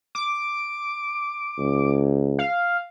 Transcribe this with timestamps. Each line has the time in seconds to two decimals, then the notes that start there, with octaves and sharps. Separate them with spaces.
0.15 D6
1.59 C#2
2.39 F5